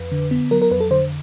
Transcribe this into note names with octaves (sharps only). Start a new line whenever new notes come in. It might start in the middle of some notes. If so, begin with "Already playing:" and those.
Already playing: F2 B4
D3
B3
F#3 A#4
A#4
F2 B4
A4
D3 C5